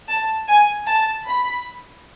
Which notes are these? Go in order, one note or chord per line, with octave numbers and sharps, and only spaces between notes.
A5
G#5
A5
B5